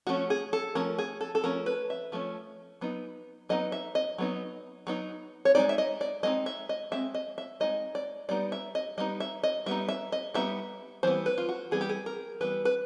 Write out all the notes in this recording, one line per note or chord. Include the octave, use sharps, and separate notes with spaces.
F3 A3 C#4 F#4
G#4
A4
F3 A3 C#4 A#4
G#4
A4
A4
F3 A3 C#4 A#4
B4
E5
F3 A3 C#4
F#3 B3 D#4
F#3 B3 D#4 D#5
E5
D#5
F#3 B3 D#4
F#3 B3 D#4
C#5
G#3 C4 D#4 D5
E5
D#5
D5
G#3 C4 D#4 D#5
E5
D#5
G#3 C4 E5
D#5
E5
G#3 C4 D#4 D#5
D5
G3 B3 D#4 D5
E5
D#5
G3 B3 D#4 D#5
E5
D#5
G3 B3 D#4 E5
E5
D#5
G3 B3 D#4 E5
E3 G3 B3 C5
B4
F4
F#4
E3 G3 B3 G#4
G4
G#4
A#4
E3 G3 B3 B4
B4